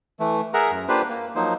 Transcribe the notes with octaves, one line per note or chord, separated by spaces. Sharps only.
E3 A3
G#4 A#4 E5 F#5 A#5
F#2
A#3 D4 F4 G4 B4 C5
A#3
F3 F#3 A#3 D#4 C5